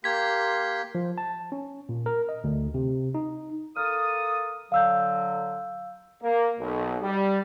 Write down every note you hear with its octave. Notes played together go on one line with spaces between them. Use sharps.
A#3 G4 C6 G#6 B6
F3
A5
C#4
A#2
A#4
D#5
D2
C3
D#4
A#3 A4 D#6 F6
D3 F#3 F5 E6 G6
A#3
B1
G3